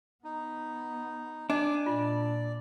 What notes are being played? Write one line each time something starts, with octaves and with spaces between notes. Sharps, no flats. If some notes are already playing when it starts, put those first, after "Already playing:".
B3 D#4
D4 D#5 G#5 D6
A#2 F4 D5